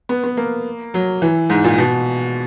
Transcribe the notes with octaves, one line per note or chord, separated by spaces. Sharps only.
B3
B3
A#3
F#3
E3
G#2
A#2
B2